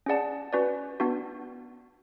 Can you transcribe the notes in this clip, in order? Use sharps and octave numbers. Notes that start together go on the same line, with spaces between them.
C#4 G#4 D5 F#5 A5
C#4 F#4 B4 D5
B3 D4 F#4